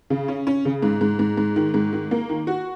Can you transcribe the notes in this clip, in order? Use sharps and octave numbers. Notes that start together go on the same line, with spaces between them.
C#3
C#4
C#4
C#3
G#2
G#2
G#2
G#2
D#3
G#2
D#3
A#3
D#3
F#4